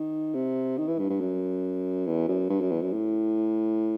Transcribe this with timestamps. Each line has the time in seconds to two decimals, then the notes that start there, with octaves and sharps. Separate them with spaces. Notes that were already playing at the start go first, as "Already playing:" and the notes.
Already playing: D#3
0.34 C3
0.78 D#3
0.88 E3
0.98 G2
1.10 G2
1.20 F#2
2.07 E2
2.28 F#2
2.49 G2
2.61 F#2
2.71 E2
2.81 F#2
2.93 A2